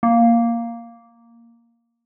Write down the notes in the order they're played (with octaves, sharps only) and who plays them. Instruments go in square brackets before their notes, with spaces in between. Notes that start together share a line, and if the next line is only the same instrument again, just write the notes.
[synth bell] A#3